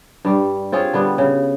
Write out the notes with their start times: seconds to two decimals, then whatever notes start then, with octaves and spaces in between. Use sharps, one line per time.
0.25 G2 G3
0.72 C4 F4 G#4 C#5
0.93 D3 G3 B3
1.18 C#3